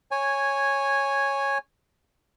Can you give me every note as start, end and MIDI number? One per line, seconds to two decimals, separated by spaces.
0.11 1.58 73
0.11 1.58 80